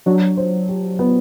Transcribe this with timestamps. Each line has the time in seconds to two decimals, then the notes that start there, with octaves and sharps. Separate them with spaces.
0.06 F#3 D4
0.37 C5
0.68 G4
0.99 B3